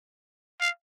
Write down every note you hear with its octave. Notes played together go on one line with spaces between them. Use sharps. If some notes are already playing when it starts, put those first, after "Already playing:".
F5